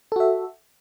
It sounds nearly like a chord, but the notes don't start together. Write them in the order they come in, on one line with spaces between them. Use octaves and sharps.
A4 F#4 E5